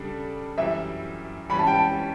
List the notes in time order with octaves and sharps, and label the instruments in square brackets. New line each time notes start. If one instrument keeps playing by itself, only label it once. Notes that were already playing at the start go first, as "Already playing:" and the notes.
Already playing: [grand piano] C#3 G3 D4 A4
[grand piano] F#2 E3 G3 [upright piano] E5
[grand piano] E3 G3 C#4 [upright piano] B5
[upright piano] A5
G5
A5